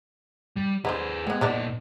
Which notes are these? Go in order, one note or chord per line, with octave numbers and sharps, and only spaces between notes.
G3
D3 D#4 G#4 B4 C5
G#3 B3 C4
A#2 B3 D4 D#4 A4